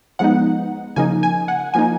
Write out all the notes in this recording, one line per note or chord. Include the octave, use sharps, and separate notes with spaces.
F3 G#3 B3 D#4 F#5
C#3 F3 A#3 D#4 G#5
G#5
F#5
F3 A#3 D#4 G#5